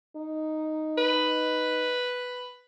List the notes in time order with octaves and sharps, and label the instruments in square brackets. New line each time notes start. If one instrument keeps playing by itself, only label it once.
[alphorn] D#4
[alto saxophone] B4